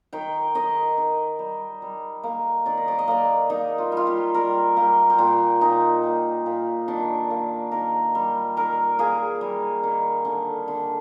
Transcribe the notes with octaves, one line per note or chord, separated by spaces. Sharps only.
D#3 G5
D#3 D#5
D#3
G3
G3
A#3
D#3 D5
D#5
D5
D#5
A#3 D5
A#3 D#4
F4
G3
F4
G4
G3 A#4
A#3 G4
G4
A#2 F4
A#2 D#4
A#2
A#2
D#3 D4
A#3
D#3 A#4
G3
D#3 A#4
A#3 G#4
G3
D#3
D3
D3